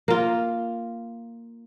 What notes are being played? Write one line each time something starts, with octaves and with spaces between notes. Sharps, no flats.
A#3 F4